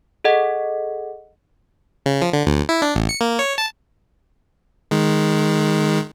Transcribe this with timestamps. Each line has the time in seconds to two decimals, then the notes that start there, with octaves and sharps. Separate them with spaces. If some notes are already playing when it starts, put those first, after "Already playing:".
0.24 G#4 A4 D#5 F#5
2.06 C#3
2.22 F3
2.33 D3
2.46 D2
2.69 E4
2.82 D4
2.95 A1
3.09 C#7
3.21 A#3
3.39 C#5
3.58 A5
4.91 D#3 G#3